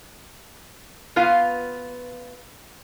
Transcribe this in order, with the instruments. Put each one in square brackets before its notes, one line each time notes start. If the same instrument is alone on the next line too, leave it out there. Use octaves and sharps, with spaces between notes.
[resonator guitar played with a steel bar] B3 F4 B4 F5